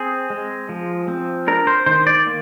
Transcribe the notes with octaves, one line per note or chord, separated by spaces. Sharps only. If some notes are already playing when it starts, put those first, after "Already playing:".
Already playing: C4 G#4
G#3
F3
C4
D4 A#4
C5
D#3 C5
D5
A#3